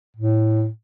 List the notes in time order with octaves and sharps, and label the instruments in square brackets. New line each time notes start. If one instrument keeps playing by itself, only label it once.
[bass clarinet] A2